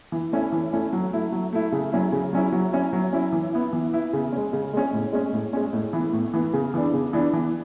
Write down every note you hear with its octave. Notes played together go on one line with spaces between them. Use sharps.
E3
A3 C#4 E4
E3
A3 C#4 E4
F#3
A3 E4
F#3
A3 E4
C#3
F#3 C#4 E4
C#3
F#3 C#4 E4
F#3
C#4 E4
F#3
C#4 E4
E3
B3 E4
E3
B3 E4
C#3
G#3 C#4
C#3
G#3 C#4
A2
G#3 C#4
A2
G#3 C#4
A2
E3 B3
A2
E3 B3
C#3
E3 B3 D4
C#3
E3 B3 D4
E3